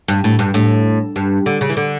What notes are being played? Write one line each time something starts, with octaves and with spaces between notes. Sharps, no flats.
G2
A2
G2
A2
G2
D3
C#3
E3
D3